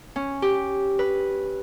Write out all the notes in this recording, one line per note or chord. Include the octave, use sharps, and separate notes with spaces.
C#4
G4
B4